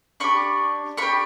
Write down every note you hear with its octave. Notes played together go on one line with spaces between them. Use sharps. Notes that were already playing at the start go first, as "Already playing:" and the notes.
D4 G4 B5 C#6
B3 D4 G4 B5 C#6